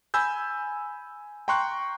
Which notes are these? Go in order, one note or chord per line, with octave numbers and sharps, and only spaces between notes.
G#5 B5 E6 G6
G5 A#5 C6 C#6 F#6